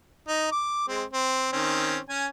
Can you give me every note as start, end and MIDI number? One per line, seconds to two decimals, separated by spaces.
0.28 0.48 63
0.52 0.84 86
0.88 1.04 56
0.88 1.04 60
1.13 1.48 60
1.52 1.99 51
1.52 1.99 60
1.52 1.99 61
2.09 2.27 61
2.09 2.27 80